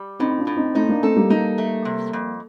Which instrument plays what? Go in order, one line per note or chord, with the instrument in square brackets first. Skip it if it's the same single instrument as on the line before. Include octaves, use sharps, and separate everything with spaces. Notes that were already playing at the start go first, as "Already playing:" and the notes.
Already playing: [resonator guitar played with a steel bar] G3
[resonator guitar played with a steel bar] A2 [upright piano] C4 D#4
[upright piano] D4 F4
[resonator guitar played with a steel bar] A2
[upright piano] C4 D#4
[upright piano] A3 C4 [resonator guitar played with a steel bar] D#4
[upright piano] A#3 D4
[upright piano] A3 C4 [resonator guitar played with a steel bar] A4
[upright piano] G3 A#3
[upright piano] G3 A#3 [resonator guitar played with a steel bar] D#4
[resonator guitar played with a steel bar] A3
C3
F2